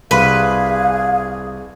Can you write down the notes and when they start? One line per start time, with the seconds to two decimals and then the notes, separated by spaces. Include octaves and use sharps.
0.11 C2 G#4 B4 F5 B5 C6